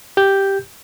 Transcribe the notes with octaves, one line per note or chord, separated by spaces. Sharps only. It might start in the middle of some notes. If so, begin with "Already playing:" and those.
G4 G6